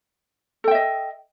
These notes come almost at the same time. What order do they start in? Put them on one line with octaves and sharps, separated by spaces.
A4 G5 E5 D#5